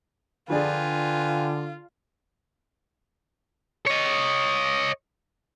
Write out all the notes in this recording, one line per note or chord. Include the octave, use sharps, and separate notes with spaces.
D3 F3 D4 F4 G#4 B4 G5 G#5
C#5 D#5